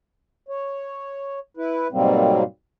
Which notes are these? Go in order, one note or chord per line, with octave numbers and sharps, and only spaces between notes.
C#5
E4 B4
G#2 B2 F#3 G3 A#3 C4